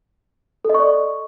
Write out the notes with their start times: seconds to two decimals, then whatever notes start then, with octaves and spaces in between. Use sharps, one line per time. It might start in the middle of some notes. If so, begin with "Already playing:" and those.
0.65 A4
0.70 D#5
0.74 C#6
0.79 D5